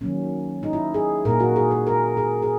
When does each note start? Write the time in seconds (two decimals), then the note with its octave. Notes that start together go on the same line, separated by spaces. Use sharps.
0.01 D#3 F#3 A#3 C#4
0.63 D#4
0.73 E4
0.94 G#4
1.25 A#2 A#3 A#4
1.40 F#4
1.56 G#4
1.71 A#4
1.87 A#4
2.17 G#4
2.42 G#4